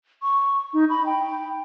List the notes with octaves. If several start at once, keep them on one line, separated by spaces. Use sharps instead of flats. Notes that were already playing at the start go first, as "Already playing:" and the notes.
C#6
D#4
B5
G5